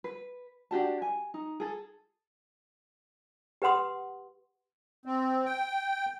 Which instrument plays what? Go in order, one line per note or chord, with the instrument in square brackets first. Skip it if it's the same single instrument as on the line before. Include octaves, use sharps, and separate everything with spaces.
[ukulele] B4
D4 F#4 G4 A5
G#5
D#4
G#4 A4
[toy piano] G4 B4 F#5 C6 D#6
[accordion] C4
G5